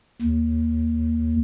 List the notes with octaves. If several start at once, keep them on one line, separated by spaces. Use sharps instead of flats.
D#2